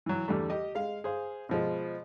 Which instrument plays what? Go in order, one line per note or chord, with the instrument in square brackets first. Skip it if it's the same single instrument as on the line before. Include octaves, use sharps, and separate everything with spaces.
[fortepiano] E3 F#3
E2 D3 G3 A3
G4 D#5
G#3 F5
G#4 C5 F5
B2 F3 G#3